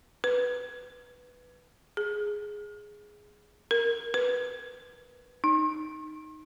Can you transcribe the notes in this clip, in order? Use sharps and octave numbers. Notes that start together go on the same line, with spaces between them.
B4
G#4
A#4
B4
D#4